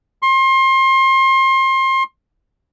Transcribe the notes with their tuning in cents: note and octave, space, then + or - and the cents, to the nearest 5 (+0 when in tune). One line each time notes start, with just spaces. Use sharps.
C6 +30